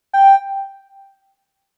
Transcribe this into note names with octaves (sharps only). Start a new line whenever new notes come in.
G5